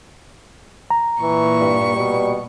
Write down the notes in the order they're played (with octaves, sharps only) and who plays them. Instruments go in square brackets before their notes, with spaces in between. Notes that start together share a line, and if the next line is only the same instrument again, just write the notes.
[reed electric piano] A#5
[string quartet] A#2 C#6 [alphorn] E3
[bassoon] G2
[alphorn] B2 [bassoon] G3